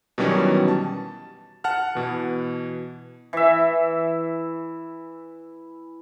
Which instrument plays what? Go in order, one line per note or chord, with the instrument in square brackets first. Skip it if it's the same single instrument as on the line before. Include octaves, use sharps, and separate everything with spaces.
[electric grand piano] B2 D#3 E3 F#3 G3 C#4
A5
F#5 A5 F6
B2 E3
[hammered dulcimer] E3 E5